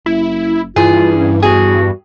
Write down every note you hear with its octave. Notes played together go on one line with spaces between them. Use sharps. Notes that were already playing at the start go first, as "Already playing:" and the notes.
F#1 E4
G2 E3 F4 G#4
C#4
E2 F#4 G#4